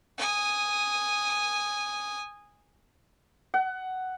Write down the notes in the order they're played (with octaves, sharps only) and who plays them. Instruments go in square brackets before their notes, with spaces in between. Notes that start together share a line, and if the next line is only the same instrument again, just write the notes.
[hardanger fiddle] G#5 D#6
[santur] F#5